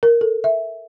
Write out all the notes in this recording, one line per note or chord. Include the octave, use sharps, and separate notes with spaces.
A#4
A4
E5